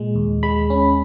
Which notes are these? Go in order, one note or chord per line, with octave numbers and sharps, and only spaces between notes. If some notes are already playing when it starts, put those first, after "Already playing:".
Already playing: A#2 G#3
D#2
G#3 B5
C#4